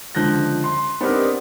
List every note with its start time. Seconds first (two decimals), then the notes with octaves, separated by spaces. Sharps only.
0.15 C#2 D3 F3 F#6 G6 A#6
0.64 C6
1.01 B3 C4 D4 D#4 G4 A#4